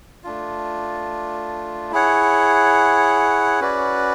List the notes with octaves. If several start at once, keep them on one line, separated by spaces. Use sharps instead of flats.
A3 D4 F4
E4 G#4 C#5 F#5
C#4 F#4 B4 D5